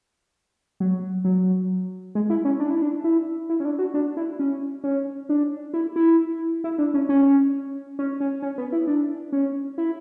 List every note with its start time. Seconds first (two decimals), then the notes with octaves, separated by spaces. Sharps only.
0.80 F#3
1.25 F#3
2.15 G#3
2.30 E4
2.45 C#4
2.60 D4
2.70 E4
2.82 D4
3.04 E4
3.50 E4
3.60 C#4
3.65 D4
3.79 F#4
3.94 D4
4.17 E4
4.39 C#4
4.84 C#4
5.29 D4
5.74 E4
5.96 E4
6.64 E4
6.78 D4
6.94 C#4
7.09 C#4
7.99 C#4
8.20 C#4
8.42 C#4
8.58 B3
8.72 E4
8.87 D4
9.32 C#4
9.78 E4